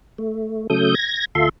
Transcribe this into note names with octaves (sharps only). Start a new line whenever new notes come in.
A3
C#3 F#3 A3 A4 D#6 G6
G#6 A#6
D2 F4 A4 E5 C6